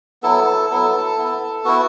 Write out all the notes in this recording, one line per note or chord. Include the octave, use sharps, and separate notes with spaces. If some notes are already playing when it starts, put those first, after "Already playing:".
F#3 B3 E4 A4
F#3 B3 E4 A4
B3 E4
B3 E4 F#4